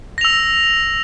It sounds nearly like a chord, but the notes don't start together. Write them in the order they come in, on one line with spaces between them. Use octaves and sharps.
A#6 F7 E6